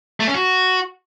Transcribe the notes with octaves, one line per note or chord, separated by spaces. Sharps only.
A3
C#4
F#4